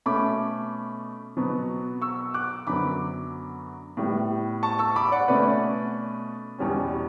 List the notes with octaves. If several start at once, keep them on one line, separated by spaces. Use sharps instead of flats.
B2 A3 C#4 B5 D6
B2 F#3 B3
C#6 E6
D6 F#6
F#2 D3 F#3 B3 B5 D6
A2 G3 B3
A5 C#6
C#6 E6
B5 D6
D5 F#5
B2 A3 C#4 B4 D5
E2 B2 G3 C#4